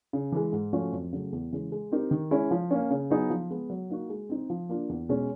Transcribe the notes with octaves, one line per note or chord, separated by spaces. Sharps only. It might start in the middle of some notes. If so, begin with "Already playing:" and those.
C#3
E3 G#3
G#2
F3 A3 C#4 F#4
F2
C#3 F#3 A3
E2
C#3 E3 G#3
G#3
C4 D#4 G4 A#4
D#3
G#3 C#4 E4
F3
A#3 C#4
C#3
F#3 B3 D#4 G#4
F3
G#3 B3
F#3
A#3 D#4 F#4
G#3
C4 D#4
F3
A#3 D4 F4
E2
B2 G#3 C#4